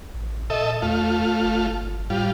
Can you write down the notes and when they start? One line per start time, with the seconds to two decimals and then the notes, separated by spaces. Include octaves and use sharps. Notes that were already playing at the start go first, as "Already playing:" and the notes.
0.14 A1
0.50 A#2 A4 D#5 E5
0.82 E2 A3 F4
1.43 G1
2.10 A2 G3 F4